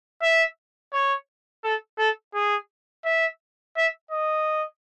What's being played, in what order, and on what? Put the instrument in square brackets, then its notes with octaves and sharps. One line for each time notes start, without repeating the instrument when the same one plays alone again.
[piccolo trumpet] E5
C#5
A4
A4
G#4
E5
E5
D#5